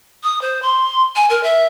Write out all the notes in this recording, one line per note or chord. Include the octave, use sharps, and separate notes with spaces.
D#6
C5
C6
G#5
A#4
E5